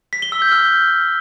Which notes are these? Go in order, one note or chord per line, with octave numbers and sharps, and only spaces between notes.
B6
G7
E6
G6
F6